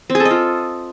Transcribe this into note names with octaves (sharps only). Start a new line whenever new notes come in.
C4
G#4
A4
D#5
F4